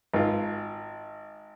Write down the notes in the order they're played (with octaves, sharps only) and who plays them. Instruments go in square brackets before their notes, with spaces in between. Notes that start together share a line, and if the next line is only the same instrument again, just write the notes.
[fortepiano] G#1 F4